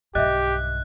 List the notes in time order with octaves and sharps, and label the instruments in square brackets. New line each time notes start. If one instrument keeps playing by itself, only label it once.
[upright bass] B1 G2 [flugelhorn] G4 [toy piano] D#5 E5 [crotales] F#6